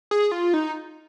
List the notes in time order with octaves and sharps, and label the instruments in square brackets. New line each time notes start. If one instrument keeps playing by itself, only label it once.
[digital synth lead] G#4
F4
D#4